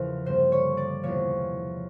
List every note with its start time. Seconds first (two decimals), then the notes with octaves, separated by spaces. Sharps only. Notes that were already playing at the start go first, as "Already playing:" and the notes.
Already playing: E2 C#3 F3 A#4
0.26 G2 D3 G3 A#3 C5
0.52 C#5
0.77 D5
1.03 E2 C3 F3 A#3 C#5